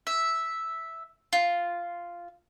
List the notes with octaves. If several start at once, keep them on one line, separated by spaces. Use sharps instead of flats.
E5
F4